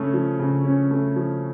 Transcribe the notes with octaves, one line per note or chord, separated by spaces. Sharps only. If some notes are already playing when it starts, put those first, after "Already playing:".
Already playing: C#3 A3 C#4
F3
C#3
C#4
A3
F3